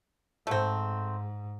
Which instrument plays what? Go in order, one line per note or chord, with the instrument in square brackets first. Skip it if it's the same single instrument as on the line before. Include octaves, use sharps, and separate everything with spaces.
[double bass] G#2 [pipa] A3 C4